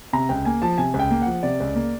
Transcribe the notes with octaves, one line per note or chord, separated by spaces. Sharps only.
C3 A#5
C#2 G5
A#3 G#5
F3 A5
C3 G#5
C#2
G5
A#3
F3 F#5
C3 D5
C#2
A#3